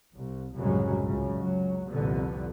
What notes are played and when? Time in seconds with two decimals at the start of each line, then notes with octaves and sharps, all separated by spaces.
0.15 C2
0.56 C2 F#2 A2 C#3 F#3 G#3
1.04 C#2 F#2 C#3
1.37 C#2 F#3
1.88 C2 F2 A#2 D3 B3